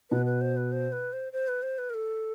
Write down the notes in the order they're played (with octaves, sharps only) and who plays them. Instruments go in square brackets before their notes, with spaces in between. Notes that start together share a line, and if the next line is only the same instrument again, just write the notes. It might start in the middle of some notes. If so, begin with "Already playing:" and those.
[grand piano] B2 [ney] B4
[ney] B4
C5
B4
C5
B4
C5
C5
B4
C5
B4
A#4
A4